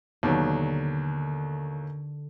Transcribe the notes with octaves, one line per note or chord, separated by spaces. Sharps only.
D#2 B2 D3 F#3